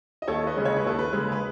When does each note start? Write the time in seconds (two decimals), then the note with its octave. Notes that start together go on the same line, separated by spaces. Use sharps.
0.22 D#5
0.28 D#2 A4 C#5
0.47 B4 D#5
0.56 C#3 G#3
0.65 C#5
0.77 B4
0.84 D#2 A4
0.99 B4
1.13 C#3 G#3
1.32 B4